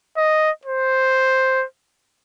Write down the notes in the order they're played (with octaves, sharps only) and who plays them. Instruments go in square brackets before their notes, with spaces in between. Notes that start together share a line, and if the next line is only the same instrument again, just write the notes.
[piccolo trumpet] D#5
C5